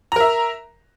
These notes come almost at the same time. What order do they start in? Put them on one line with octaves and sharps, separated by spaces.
A#5 A#4 E5